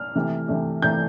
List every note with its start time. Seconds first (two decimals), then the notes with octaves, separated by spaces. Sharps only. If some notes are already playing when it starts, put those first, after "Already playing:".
Already playing: F6
0.15 C3 E3 A3
0.48 C3 E3 A3
0.82 C3 E3 A3 G6